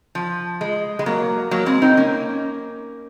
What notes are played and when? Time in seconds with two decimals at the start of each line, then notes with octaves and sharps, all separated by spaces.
0.15 F3
0.61 G#3
0.99 G#3
1.06 F#3 A#3
1.51 F#3 A#3
1.66 G#3 C4
1.82 C4 D#4
1.97 A#3 C#4